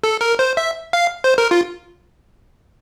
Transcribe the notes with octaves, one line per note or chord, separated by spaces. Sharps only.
A4
A#4
C5
E5
F5
C5
A#4
F4